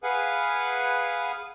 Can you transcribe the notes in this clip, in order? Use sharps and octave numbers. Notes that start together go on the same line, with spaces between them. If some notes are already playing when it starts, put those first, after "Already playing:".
G#4 B4 F5 F#5 G#5